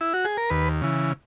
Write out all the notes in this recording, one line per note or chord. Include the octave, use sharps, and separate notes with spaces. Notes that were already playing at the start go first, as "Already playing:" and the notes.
E4
F#4
G#4
A#4
D#2 B4
C#3 E3